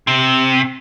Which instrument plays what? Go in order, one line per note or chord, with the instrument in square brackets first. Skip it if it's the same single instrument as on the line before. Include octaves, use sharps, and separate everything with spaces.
[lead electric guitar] C3